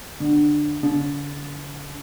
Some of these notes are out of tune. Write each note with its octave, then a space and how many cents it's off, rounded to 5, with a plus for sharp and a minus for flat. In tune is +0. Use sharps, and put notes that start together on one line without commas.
D3 +20
D3 -40